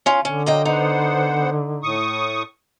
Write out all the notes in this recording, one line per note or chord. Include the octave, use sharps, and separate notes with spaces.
C#4 F4
D3 C#4
F#3 A#3 D#5 G5
B3 D#4 C5 F#5
A2 C#6 D#6